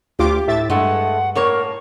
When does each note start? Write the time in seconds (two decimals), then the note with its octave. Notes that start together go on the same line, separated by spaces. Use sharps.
0.19 D2 F4 G4 D6
0.47 A2 E5 A6
0.70 G2 G#3 A3 F#5
1.35 A2 A#3 A#4 C#5